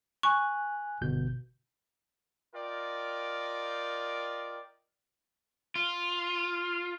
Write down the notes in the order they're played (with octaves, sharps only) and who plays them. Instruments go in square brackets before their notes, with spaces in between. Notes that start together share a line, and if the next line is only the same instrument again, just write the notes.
[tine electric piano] G#5 F#6 [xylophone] C#6
[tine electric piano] G1 B2 G6
[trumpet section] F4 A#4 D5 D#5 G5
[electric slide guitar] F4